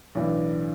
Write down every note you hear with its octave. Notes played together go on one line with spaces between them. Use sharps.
B1 A2 E3 D4